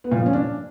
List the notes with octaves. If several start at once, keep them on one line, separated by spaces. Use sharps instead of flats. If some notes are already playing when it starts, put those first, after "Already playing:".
B3
A#2
F3
C#4
D4